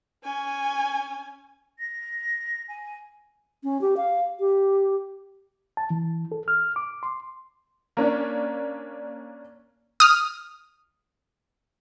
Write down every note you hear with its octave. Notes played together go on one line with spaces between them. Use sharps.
C#4 G#5
A#6
G#5
C#4
G4
F5
G4
A5
E3
A4
F6
D6
C6
A#3 C#4 D4
D#6 F6